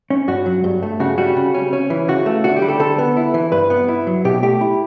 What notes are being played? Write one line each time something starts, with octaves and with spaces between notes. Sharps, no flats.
C#4
G2 F#4
F#3
G2
A3
C#3 F#4
G3 F#4
C#3
C#4
C#4
E3
C#3 F#4
A3
D3 F#4
G4
G3
A4
D3 A4
B3
E4
E3
G2 B4
B3
E4
F#3
B2 G4
A3 G4
E4